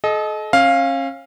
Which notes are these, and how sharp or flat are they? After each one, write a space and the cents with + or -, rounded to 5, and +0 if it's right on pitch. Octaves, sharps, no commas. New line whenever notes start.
A4 -40 D#5 +0
C#4 -35 F5 +0